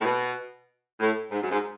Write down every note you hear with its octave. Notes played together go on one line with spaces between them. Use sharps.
A2
B2
A2
G#2
F#2
G#2